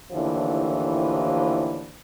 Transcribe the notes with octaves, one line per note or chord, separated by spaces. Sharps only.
D#2 A2 D3 E3 F3